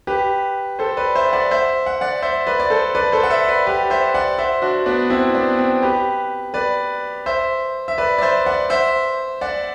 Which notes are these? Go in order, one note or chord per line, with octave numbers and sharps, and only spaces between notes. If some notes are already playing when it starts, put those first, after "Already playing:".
G4 B4
A4 C5
B4 D5
C5 E5
D5 F#5
C5 E5
F#5
D5 F#5
C5 E5
B4 D5
D5
A4 C5
B4 D5
A4 C5
F#5
C5 E5
B4 D5
G4 B4
C5 E5
D5 F#5
C5 E5
D4 F#4
B3 D4
C4 E4
B3 D4
C4
G4 B4
B4 D5
C5 E5
E5
B4 D5
D5
C5 E5
D5 F#5
C5 E5
D5 F#5